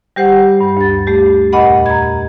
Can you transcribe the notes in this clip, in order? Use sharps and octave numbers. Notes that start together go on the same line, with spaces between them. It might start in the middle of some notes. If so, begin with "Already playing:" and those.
G3 G4 C5 F#5
G2
D2 A6
A3 G4
E2 A#2 D#5 F#5 B5
A#5 G#6